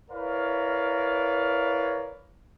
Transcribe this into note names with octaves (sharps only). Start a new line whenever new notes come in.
E4 A#4 B4 C#5 D5 F5